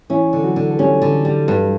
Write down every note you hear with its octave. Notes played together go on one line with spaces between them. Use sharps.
E3 C#4 E4
D3
F#3 F#4
D3
A4
G3 C#4 G4
D3
G3
G2